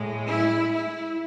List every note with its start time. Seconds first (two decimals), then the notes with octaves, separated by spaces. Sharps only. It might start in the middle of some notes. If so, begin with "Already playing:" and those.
Already playing: A2 G#3
0.28 E4
0.73 E4